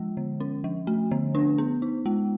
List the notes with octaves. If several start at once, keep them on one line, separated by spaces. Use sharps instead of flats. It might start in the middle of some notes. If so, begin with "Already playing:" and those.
Already playing: F3 G#3
D3
C#4
F3
A3
D3
D4
B3
D#4
G#3